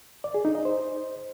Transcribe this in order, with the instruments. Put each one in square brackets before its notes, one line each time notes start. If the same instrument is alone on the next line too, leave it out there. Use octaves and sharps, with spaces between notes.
[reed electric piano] D5
G#4
D#4
D#5
C5